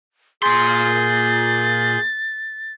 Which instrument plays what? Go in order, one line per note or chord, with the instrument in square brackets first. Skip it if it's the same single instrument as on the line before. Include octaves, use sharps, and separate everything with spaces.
[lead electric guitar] A#2 C6 [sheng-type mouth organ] G#4 G6 [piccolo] A6